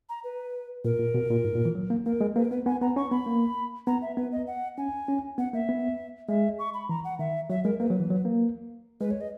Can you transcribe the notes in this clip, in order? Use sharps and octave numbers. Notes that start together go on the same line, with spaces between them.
A#5
B4
A#2 A#4
A#2
B2
A#2
G#2
A#2
E3
F#3
A#3
A#3 A#4
G#3
A#3 B4
A#4
B3 B4
B3 G#5
B3 A#5
C#4 C#6
B3 B5
A#3
B3 A#5
E5
B3 B4
D#5
F#5
C#4 G#5
C#4
B3 F#5
A#3 E5
B3
G#3 E5
C#6
B5
E3 A#5
F#5
D#3 E5
F#3 E5
G#3 A#4
A#3 B4
F#3
E3
F#3
A#3
G#3 B4
C#5
D#5